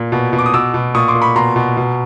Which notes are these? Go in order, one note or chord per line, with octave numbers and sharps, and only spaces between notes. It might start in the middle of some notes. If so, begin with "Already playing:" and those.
Already playing: A#2
B2
B2
D6
D#6
B2 D6 E6
B2
A#2 C#6 D#6
C6 D6
A#2
B5 C#6
B2 A#5 C6
B2
B2